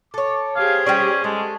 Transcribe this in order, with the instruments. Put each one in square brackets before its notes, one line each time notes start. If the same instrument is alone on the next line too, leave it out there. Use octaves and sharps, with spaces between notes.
[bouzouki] A4 C#5 [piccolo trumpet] D6
[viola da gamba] G4 G#4 C5 [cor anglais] F5 [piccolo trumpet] G#6
[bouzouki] G3 D5 [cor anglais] C#4
[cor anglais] G#3 [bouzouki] A3